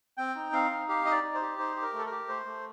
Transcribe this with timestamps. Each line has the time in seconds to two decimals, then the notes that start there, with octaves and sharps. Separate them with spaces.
0.18 C4 G5
0.35 D#4
0.52 C4 F5
0.70 D#4
0.89 G4 F5
1.05 D#4 D#5
1.11 D5
1.23 D#4
1.35 C5
1.41 G4
1.58 D#4 C5
1.76 G4
1.82 A#4
1.93 A3
1.98 A4
2.06 A#4
2.11 G4
2.28 A3 C5
2.46 A3